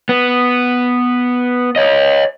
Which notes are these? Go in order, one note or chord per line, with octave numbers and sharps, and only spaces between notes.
B3
C#5 D#5